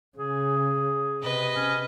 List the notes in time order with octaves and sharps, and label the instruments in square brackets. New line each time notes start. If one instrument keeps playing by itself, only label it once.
[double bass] C#3 [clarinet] G#4
[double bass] C3 [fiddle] B4 D#5
[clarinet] C#4